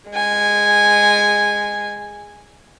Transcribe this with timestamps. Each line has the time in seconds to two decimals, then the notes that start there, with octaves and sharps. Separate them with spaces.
0.10 G#3 G#5